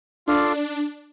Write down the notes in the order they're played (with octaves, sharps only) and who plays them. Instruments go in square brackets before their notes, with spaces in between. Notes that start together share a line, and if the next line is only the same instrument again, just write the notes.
[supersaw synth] D4 [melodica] F4 A4 D5 F5